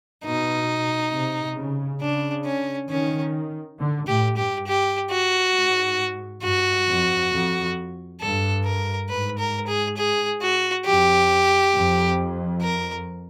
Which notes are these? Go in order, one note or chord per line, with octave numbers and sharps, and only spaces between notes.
B2 D#4
C3
C#3
C#3 D4
C#4
D#3 C#4
D3
A2 G4
G2 G4
G4
F#4
G#2
G2 F#4
F2
F2
G2 A4
A#4
G#2 B4
A#4
G#4
G#4
F#4
F2 G4
F2
A#4